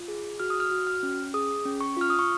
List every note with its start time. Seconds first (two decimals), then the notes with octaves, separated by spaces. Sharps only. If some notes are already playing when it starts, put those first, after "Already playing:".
Already playing: F4
0.08 G#4
0.40 F#4 F6
0.50 D#6
0.60 F6
0.71 F#4
0.87 F6
1.03 C#4
1.34 G#4 D#6
1.65 C#4
1.81 C#6
1.97 F4 F6
2.10 D#6
2.19 C#6